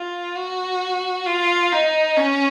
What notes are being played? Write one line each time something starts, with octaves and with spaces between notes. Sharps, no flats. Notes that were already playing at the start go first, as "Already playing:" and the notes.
Already playing: F4
F#4
F4
D#4
C#4